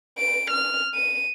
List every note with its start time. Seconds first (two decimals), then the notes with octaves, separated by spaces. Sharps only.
0.18 D7
0.51 F6
0.94 D#7